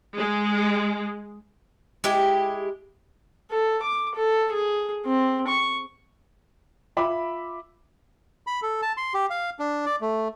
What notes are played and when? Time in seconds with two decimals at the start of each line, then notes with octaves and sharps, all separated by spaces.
0.17 G#3
2.04 G#3 E4 G4
3.51 A4
3.83 D6
4.16 A4
4.52 G#4
5.06 C4
5.48 C#6
6.97 F4 E5 B5 D6
8.47 B5
8.62 A4
8.82 A5
8.97 C6
9.14 G4
9.30 F5
9.59 D4
9.86 D5
10.01 A3